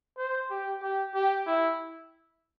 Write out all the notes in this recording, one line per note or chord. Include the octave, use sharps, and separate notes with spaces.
C5
G4
G4
G4
E4